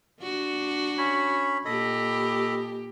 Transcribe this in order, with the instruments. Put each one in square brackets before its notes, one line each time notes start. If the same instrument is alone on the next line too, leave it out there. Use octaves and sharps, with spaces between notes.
[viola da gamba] D4 F#4
[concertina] C#4 C#5 B5
[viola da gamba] A#2 G4 [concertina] A4 D#5 B5